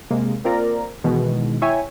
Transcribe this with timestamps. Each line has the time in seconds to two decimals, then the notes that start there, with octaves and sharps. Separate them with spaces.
0.11 C3 G#3 A#3
0.44 A#3 C4 F4 A#4 D5 A#5
1.04 B2 D#3 E3 G#3
1.62 E4 C#5 E5 G5 G#5